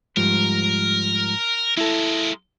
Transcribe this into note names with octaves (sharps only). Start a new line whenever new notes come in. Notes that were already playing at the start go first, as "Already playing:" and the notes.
G#2 F3 G3 A#4
G#3 A#3 E4 A4